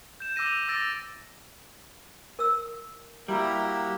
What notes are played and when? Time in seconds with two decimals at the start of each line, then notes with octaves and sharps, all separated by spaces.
0.20 G6 E7
0.36 D6 E6 G6 A#6 D#7
0.68 D6 E6 A6 A#6 D7
2.39 A#4 E6
3.28 G3 A#3 E4 F#4 G4 A#5